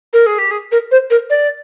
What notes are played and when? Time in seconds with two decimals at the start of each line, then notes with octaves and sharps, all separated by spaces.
0.13 A#4
0.26 G#4
0.38 G4
0.51 G#4
0.72 A#4
0.91 C5
1.10 A#4
1.30 D5